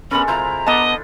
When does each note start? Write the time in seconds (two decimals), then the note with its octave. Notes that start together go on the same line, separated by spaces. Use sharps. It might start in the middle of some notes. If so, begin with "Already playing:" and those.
0.11 G#3 B3 C#4 A4 A#4 B5
0.28 C3 E4 F4 C5 A#5
0.67 B3 D4 A4 D#5 A5